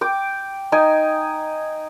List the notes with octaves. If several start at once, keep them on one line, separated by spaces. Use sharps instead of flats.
G5 D6
D#4 G5 G#5